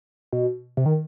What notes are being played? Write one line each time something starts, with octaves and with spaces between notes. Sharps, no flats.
B2
C3
D#3